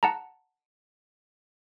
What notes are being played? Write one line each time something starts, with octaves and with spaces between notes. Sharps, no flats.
F#5 A5 A#5